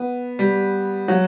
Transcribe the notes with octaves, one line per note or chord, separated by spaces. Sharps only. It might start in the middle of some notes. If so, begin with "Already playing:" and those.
Already playing: B3
G3
F#3